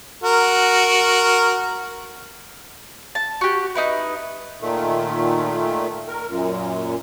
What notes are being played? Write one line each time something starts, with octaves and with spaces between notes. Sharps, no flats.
F#4 A#4
A5
F#4 G4
D#4 E4 B4
A#2 D#3 A3
A#4
F#2 A#2